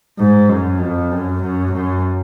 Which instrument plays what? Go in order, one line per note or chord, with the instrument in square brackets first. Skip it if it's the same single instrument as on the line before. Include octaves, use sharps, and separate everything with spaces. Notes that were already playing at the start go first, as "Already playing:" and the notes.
[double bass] G#2
F#2
F2
F#2
F#2
F#2